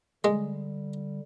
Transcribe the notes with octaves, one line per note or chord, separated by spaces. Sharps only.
D3 G3 G#3